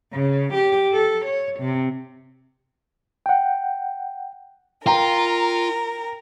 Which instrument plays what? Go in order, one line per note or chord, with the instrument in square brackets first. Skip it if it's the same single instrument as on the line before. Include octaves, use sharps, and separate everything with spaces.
[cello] C#3
G4
A4
C#5
C3
[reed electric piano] F#5 G5
[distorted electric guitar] F4 [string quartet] A#4 [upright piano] G5 A#5